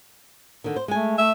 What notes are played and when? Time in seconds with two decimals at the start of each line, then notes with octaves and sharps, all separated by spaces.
0.64 D3 D#3
0.76 C5
0.88 G#3 A3 G#5
1.18 A3 E5